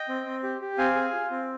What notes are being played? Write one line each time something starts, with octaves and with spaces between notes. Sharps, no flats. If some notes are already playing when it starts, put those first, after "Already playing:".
Already playing: D#5 G5
C4
C4
G4
G4
C4 F5 G#5
G#4
F4
C4